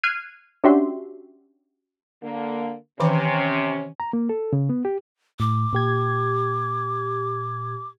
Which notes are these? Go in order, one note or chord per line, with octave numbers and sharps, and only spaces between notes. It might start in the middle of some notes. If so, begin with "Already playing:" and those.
F6 F#6 G#6 C7 D#7
C#4 D4 F#4 G4 E5 C6
D3 A#3
C3 D#3 E3 C#4 D6
A#5
A#3
A4
C#3
B3
G4
A2 D6
A#2 G4 G#6